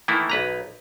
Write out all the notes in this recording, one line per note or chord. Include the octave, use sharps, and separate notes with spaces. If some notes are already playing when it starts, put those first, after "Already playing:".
D#3 E3 A3 A#3 E4
B1 B4 A#5